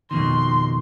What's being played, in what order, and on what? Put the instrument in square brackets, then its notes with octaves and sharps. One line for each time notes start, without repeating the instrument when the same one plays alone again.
[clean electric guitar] F2 B2 D#3 [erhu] C6